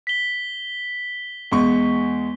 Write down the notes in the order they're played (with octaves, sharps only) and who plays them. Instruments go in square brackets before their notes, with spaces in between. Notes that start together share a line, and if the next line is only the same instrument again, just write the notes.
[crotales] B6 G7
[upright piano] E2 G#3 C#6 [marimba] B3